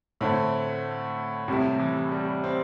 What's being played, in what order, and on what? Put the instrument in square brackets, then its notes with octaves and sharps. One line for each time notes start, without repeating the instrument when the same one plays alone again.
[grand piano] A2 [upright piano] D3 A3 C4 E4
[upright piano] A2 G3 E4 [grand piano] C3
[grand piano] E3
G3
C4